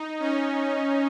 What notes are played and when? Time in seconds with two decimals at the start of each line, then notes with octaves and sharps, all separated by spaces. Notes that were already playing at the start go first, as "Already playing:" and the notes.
Already playing: D#4
0.20 C#4